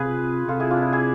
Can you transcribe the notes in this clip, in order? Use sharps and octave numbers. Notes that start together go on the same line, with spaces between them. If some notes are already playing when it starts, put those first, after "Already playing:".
Already playing: C3 F4 G#4 B4
C3 F4 A4
E4 G#4
D4 F4
E4
E4 G#4